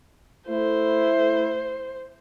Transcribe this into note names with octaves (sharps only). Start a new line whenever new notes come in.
A3 E4 C5